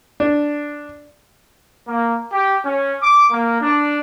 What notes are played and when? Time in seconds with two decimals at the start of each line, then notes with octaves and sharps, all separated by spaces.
0.20 D4
1.87 A#3
2.32 G4
2.64 C#4
3.02 D6
3.32 A#3
3.61 D4